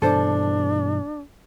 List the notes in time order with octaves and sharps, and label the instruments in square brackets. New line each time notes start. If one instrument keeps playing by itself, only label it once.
[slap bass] G2 B2 E3 [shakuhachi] D4 [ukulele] A4 C5